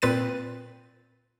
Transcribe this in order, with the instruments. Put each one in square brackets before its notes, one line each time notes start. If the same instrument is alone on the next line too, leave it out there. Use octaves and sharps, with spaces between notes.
[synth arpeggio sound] A#2 C4 B4 A6 D#7